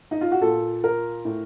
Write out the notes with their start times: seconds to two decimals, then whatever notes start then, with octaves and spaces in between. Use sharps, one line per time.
0.11 D#4
0.21 F4
0.32 F#4
0.42 A#2 A4
0.84 A#4
1.25 A2